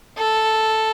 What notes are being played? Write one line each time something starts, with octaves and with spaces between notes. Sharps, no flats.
A4